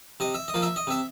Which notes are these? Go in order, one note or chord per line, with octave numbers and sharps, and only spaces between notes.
C3 D#5
E5
D#5
F3 A#3
E5
D#5
C3 E5